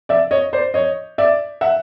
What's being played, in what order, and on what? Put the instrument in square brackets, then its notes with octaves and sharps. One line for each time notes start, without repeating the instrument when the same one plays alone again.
[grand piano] D5 E5
C#5 D#5
C5 D5
C#5 D#5
D5 E5
E5 F#5